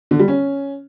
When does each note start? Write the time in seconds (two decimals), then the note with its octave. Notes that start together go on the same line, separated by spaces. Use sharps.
0.11 D3
0.19 G3
0.28 C#4